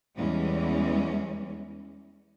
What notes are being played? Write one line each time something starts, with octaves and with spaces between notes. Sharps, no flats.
E2 E3 G3 G#3 C#4